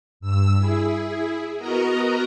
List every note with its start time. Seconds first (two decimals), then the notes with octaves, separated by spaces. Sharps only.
0.20 G2 E6
0.57 E4 G#4
1.58 B3 F#4 A#4 D#5 A#5